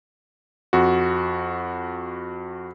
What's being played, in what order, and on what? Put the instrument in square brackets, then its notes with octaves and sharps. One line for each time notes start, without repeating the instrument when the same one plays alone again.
[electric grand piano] F2 F#4